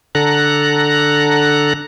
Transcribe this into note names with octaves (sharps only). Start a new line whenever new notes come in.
D3 A4 A#5 F#6